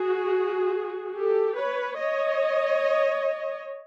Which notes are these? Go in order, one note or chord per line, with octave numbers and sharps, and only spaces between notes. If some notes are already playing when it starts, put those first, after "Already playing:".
Already playing: F#4 G#4
G4 A4
B4 C#5
C#5 D#5